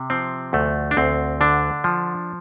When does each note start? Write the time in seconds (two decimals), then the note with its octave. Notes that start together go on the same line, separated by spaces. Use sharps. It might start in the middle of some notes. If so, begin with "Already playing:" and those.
Already playing: C3
0.10 F3 C4
0.53 D2 A3
0.91 D4
0.97 D2 C4
1.41 D3 D4
1.84 F3